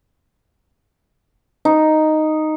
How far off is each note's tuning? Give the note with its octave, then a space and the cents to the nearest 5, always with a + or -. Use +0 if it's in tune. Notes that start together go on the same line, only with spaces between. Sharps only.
D#4 -5